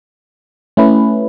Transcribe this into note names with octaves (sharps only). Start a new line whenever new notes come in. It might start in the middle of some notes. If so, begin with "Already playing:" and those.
A3 C#4 E4 B4